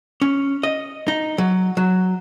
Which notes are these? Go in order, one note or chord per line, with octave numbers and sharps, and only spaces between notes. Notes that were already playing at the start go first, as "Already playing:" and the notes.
C#4
D#5
D#4
F#3
F#3